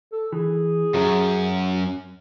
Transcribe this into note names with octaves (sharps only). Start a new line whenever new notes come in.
A4
E3 G#4
F#2 F#4 E5 A#5